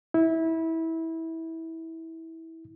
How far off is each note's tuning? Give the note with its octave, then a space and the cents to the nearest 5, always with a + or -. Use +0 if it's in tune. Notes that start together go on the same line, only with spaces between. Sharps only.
E4 -20